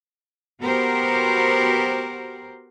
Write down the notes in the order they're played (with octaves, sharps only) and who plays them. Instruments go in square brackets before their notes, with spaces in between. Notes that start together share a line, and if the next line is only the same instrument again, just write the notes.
[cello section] B3 F#4 G4 A#4 C5